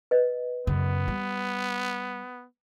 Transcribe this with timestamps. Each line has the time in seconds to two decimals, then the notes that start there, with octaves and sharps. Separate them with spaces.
0.11 B4 D#5
0.67 F#2 C#3 B3
1.08 G3